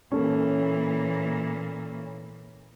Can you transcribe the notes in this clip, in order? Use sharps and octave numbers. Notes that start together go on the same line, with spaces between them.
A#2 E3 A#3 C#4 A4 C#5